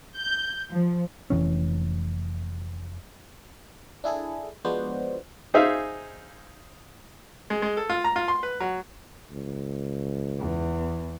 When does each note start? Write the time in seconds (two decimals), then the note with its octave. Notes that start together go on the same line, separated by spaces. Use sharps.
0.16 G6
0.70 F3
1.30 F1 F2 E3 C#4
4.04 D4 E4 G#4 A4
4.65 F3 G#3 B3 D4 F#4 C5
5.54 D#4 G#4 C5 E5 F5 G#5
7.50 G#3
7.62 G#3
7.77 A4
7.89 F4
8.04 A#5
8.16 F4
8.28 C6
8.43 B4
8.60 F#3
9.31 C#2
10.40 E2